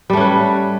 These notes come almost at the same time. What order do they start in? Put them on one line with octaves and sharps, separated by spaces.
G3 A3 C#4 B4